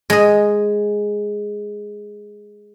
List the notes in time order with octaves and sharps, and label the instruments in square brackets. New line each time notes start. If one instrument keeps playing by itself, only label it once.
[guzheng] G#3 D#5